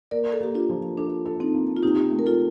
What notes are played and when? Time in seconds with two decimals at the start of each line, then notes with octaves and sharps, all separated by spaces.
0.11 A#3 A#4 D5
0.32 A4
0.41 A#3 G4
0.55 D4 F4
0.70 F3
0.98 D4 A4
1.25 A4
1.40 C4 D#4
1.54 A#3
1.77 F4
1.83 C3 D#4 G4
2.11 A3
2.19 A#4
2.26 F4 A4